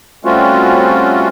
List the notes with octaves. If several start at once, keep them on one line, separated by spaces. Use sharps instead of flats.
G3 A3 C4 C#4 F4 F#4